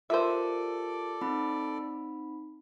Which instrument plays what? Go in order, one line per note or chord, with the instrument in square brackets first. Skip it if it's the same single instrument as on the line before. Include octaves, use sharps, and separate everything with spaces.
[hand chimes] F4 G4 A#4 [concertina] A4 D5 D6 [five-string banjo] C5 E5
[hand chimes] C4 D#4 B5